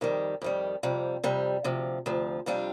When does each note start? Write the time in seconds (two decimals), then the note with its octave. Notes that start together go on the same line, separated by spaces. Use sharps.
0.01 F2 D#3 G3
0.42 F2 D#3 G3
0.83 F2 C3 G3
1.24 F2 C3 G3
1.64 D2 C3 F3
2.06 D2 C3 F3
2.46 F2 C3 G3 D4 F4